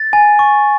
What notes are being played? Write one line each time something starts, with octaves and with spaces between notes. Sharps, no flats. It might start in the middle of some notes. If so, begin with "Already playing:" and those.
Already playing: A6
G#5
C#6